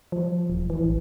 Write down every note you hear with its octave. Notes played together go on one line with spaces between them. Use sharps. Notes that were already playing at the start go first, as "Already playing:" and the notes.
F3
D#1
E3
A1